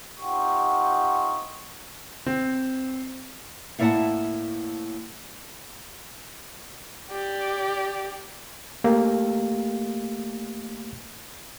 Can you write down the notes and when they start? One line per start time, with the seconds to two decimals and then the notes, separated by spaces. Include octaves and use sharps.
0.20 C4 D#4 F4 G4 F#5 C#6
2.26 C4
3.79 A2 A#3 E4 D5 F#5 A5
7.11 G4 D5
8.84 A3 A#3 G4 F5